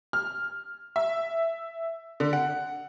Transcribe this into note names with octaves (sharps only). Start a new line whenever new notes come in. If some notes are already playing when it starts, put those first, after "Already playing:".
F6
E5
D3
F#5